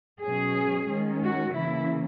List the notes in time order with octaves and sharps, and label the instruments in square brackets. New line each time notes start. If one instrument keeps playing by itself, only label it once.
[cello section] B2 F#3 C#4 G#4
D#3 G#3 C#4
F#4
C#3 E3 A#3 E4